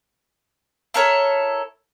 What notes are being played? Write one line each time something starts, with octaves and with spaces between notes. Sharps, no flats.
E4 A4 A#4 C#5